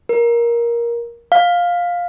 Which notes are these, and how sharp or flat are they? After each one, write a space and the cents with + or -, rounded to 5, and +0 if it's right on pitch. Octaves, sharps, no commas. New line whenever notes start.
A#4 +15
F5 +10